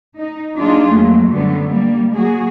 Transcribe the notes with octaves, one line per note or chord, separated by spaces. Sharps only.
D#4
F#3 A#3 D4 D#4 F4 G#4
F2 F#3 A3 A#3
F#2 D3 F#3 G3 A3 B3
G3 A#3
F#3 A#3 F#4 G#4